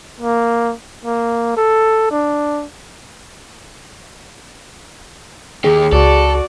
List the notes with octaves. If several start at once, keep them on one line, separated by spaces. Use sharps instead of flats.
A#3
A#3
A4
D4
D#2 G4 G#4
C#2 F#4 A4 D5